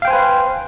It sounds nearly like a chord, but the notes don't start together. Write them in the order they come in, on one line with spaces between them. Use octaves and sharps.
F5 G5 C5 G#5 B4